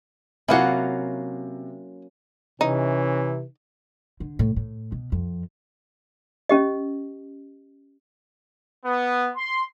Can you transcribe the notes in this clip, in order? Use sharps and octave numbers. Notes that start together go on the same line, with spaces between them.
C3 F#3 A#3 C#4 E4 F4 F#5
C3 E3 C#4 D#4
D3
A2
A2
B2
F2
C#4 G4 D#5
B3
C6